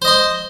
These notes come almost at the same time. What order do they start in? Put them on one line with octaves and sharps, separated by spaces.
C5 D#5 C6